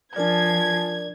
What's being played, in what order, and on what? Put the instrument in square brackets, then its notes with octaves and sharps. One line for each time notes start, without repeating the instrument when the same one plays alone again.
[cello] F3 [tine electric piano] D4 A#4 D5 [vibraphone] F4 G#5 A5 [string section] G#6